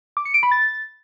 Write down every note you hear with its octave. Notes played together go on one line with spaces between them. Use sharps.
D6
C#7
D7
B5
A6